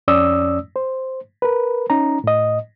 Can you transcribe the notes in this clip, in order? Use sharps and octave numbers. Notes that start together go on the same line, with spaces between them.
F2 C#4 D5 D#6 E6
C5
A#4 B4
C#4 D#4 A#5
A2 D#5